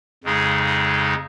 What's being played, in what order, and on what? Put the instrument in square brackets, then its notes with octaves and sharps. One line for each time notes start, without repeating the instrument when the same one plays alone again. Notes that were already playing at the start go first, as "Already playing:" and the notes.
[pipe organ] F2 C#3 G#3 D#4 G#4